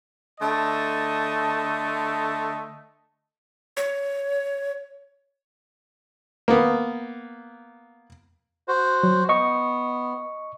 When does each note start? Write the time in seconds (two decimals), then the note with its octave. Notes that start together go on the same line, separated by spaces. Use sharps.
0.40 D3 A3 D#5 A5
3.77 C#5
6.48 A#3 B3
8.68 F#4 C5
9.03 F#3
9.29 B3 D#5 C#6